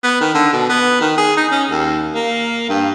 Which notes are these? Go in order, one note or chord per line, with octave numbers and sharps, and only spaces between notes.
B3
D#3
D3
B2
B3
D#3
G#4
D#4
C#4
D#2
A#3
G2